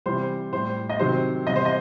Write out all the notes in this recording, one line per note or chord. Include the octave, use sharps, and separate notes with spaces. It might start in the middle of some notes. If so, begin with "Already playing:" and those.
C3 E3 G3 C5
A2 G3 C5
D#5
C3 D#3 F#3 C5
C3 E3 G3 D#5
C5
D#5